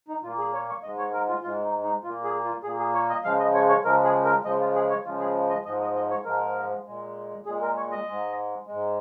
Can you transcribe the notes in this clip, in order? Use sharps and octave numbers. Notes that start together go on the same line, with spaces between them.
D#4
A#2 A#3 F4
G#4
C#5
C#5
G#2 G#3 D#5
C#5
A#4
F4
G#2 G#3 F4
D#4
D#4
A#2 A#3 F4
G#4
F4
A#2 A#3 G#4
G#4
C#5
D#5
C#3 F3 G#3 F5
D#5
C#5
C#5
C#3 F3 G#3 A#4
G#4
A#4
C#3 F3 G#3 D#5
F4
G#4
C#5
C#3 F3 G#3 F4
G#4
D#5
G#2 F3 G#3 D#5
D#5
D#5
C#5
G#2 F3 G#3 A#4
A#2 G#3
A#2 G#3 G#4
A#4
C#5
D#5
G#2 G#3
G#2 G#3